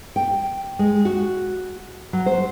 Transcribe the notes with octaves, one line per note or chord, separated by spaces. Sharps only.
G5
G#3
F#4
F#3
C5